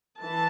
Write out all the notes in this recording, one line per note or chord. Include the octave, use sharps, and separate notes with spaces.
E3 A5